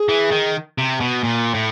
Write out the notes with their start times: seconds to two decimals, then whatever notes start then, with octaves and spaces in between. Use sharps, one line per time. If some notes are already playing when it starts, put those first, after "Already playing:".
Already playing: G#4
0.09 E3
0.32 D#3
0.78 C3
1.00 B2
1.24 A#2
1.54 A2